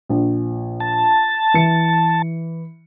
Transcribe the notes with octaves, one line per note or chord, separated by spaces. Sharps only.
A#1
A5
E3 C#7